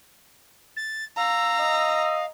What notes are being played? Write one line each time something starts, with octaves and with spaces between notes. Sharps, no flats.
A6
F5 A#5 E6
D#5